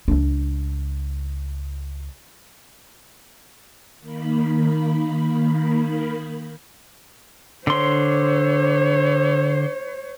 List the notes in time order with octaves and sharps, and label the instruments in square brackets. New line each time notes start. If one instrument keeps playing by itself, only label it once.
[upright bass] C#2 D4
[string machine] D#3 A#3 B5
[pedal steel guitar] D3 C6 [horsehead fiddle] C5 C#5